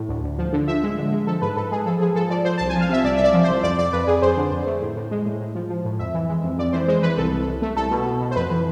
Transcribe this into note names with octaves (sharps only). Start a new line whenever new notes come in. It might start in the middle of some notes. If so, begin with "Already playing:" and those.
Already playing: A2
D2
D2
F3
D3
F3 E5
G#3
D3
G#3
F3 A4
G#2 B4
G#2 A4
G#3 G#4
F3 A4
F3 G#4
F3 A4
F3 D5
F3 C5
C2 A5
G#5
F3
F5
C3 E5
C2 D5
C2 E5
D5
F3
C2 C5
F2 D5
F2 D5
F2 B4
F2 G#4
F2 C5
D3
F2
A3
A2
A2
G#3
A2
A2
F3
F3
A2
F2 E5
E3
G#3
F2
F2 D5
E3 C5
G#3 C5
E3 B4
C2 A4
C2
C2
A3
C2 A4
B2
B2
B2
C5
F2 B4
E3